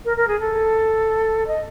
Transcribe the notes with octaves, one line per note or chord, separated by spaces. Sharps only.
A#4
A#4
G#4
A4
D#5